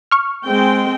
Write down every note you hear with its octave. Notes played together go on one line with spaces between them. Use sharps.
C#6 F6
G#3 C4 G5